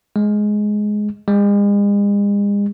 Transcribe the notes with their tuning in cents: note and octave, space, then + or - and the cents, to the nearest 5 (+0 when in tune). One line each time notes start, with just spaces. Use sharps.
G#3 +10
G#3 -40